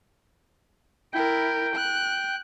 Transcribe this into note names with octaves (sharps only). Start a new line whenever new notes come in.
E4 A#4 G5
F#6